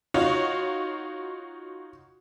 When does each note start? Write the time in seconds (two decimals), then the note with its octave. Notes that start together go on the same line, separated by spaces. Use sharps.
0.14 D#4 F4 F#4 C#5